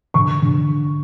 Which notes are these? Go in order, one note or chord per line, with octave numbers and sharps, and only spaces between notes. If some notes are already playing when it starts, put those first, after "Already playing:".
D3 C#6
D3